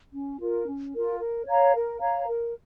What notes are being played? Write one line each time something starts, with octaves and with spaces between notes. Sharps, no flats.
C#4
F4 A#4
C#4
F4 A#4
A#4
C#5 F5 A#5
A#4
C#5 F5 A#5
A#4